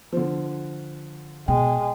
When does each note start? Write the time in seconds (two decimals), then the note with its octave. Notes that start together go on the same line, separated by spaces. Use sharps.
0.12 D3 F3
1.48 B2 G#3 G5